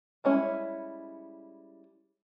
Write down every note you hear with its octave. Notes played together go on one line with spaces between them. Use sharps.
G3 G#3 C#4 E4